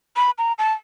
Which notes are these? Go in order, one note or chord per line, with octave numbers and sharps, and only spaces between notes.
B5
A#5
A5